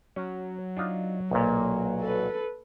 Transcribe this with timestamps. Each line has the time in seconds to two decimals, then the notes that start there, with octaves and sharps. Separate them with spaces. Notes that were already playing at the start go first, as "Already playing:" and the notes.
0.16 F#3 C#4
0.77 D4 D#4 F4
1.31 B1 A#2 A#3
2.02 A4 B4